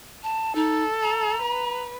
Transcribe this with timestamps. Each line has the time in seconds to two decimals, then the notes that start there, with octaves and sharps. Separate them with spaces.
0.23 A5
0.55 D#4 A4
1.03 A#5
1.42 B4